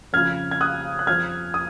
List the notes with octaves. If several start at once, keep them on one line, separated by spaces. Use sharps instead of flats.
F2 C#3 F3 F6 G#6
G#6
D#6 F#6
F#6
F2 F3 F6 G#6
D#6